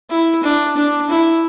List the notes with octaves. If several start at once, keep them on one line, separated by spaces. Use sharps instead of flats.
E4
D4
D4
E4